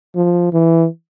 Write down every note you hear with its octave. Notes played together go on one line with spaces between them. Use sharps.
F3
E3